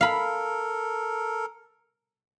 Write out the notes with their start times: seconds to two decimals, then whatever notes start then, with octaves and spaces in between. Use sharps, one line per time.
0.01 A4 A#4 F5 B5